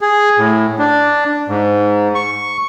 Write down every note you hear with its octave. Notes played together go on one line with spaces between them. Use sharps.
G#4
A2
D4
G#2
C#6